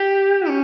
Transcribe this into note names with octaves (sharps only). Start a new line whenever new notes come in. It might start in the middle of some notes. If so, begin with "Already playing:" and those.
Already playing: G4
C#4